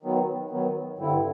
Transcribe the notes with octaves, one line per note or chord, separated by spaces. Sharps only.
D#3 F#3 B3
D#3 F#3 B3
G2 D3 G3 C4 E4